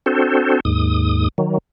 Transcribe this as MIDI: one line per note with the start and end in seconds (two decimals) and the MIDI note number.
0.06 0.60 60
0.06 0.60 62
0.06 0.60 66
0.06 0.60 69
0.06 0.60 72
0.65 1.28 39
0.65 1.28 44
0.65 1.28 87
1.38 1.58 51
1.38 1.58 54